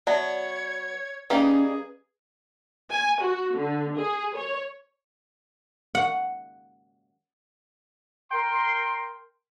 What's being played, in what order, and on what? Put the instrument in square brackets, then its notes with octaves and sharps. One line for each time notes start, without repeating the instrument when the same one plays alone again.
[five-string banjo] F#3 B3 [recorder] C#5 [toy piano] D5 E5 A5
[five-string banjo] G3 A#3 D#4 [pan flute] C#4 [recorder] G#4 [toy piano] B4
[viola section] G#5
F#4
D3
G#4
C#5
[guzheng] F#5
[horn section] A#4 G5 C6